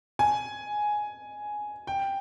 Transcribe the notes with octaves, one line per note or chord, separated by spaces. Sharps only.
G#5
G5